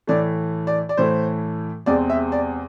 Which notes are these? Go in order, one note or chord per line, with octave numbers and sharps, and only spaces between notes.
A2 E3 A3 D5
D5
D5
A2 E3 A3 C5
E2 C3 G#3 C4 D5
E5
D5